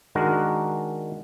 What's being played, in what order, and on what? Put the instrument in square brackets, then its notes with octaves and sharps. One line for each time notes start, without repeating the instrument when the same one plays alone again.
[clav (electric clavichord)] D#3 G#3 D4 F#4 A#4